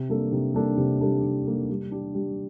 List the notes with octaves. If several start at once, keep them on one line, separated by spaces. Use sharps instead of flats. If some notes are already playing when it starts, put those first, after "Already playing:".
Already playing: C3
G3 A#3 D4 A4
C3
G3 A#3 D4 A4
C3
G3 A#3 D4 A4
C3
G3 A#3 D4 A4
G3
D4 G4
G3